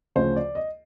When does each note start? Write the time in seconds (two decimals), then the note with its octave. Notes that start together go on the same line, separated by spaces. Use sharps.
0.16 D2 C#3 F3 C5
0.36 D5
0.55 D#5